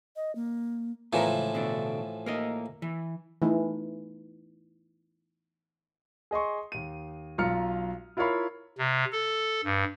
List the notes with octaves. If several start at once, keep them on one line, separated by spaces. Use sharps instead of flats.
D#5
A#3
A2 E3 F3 B3 A#4
C#2
B2 D3 D4
A#3 A#4 D#5
E3
E3 A3 D#4
G#4 D#5 C6 C#6
D#2 D#7
B1 F4 A#5 F6 C#7
E4 F4 A#4 C#5 F5 B5
C3
A4
G2